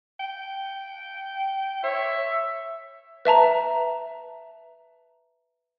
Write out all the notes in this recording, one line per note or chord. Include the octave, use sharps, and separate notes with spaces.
G5
C#5 E5
B4 E5 A5 A#5